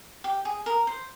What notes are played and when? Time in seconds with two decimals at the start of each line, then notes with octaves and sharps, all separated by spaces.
0.24 G4
0.45 G#4
0.66 A#4
0.87 C5